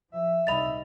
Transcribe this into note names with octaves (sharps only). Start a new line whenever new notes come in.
F3 E5
C#2 C3 G3 D#4 D#5 B5 A6 F7